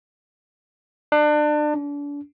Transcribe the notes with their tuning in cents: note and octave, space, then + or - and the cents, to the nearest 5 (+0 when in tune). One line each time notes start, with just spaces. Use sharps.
D4 +30
D4 -35